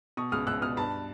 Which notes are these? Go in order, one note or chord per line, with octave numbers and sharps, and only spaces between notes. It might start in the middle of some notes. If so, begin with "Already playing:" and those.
B2 C#6 D#6
C#2 D#6 F6
C#2 E6 F#6
B2 D#6 F6
G2 A5 B5